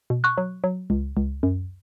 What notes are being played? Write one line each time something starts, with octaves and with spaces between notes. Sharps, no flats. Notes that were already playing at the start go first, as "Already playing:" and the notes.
B2
C#6 F#6
F#3
F#3
C#2
C#2
F#2